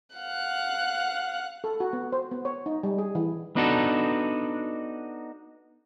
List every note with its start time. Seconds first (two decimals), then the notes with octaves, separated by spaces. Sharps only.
0.17 F5 F#5 F#6
1.64 A4
1.80 F#4
1.93 B3
2.12 C5
2.31 B3
2.45 C#5
2.66 D#4
2.83 G3
2.98 G#4
3.15 E3
3.56 B3 D4 D#4 F#4 A4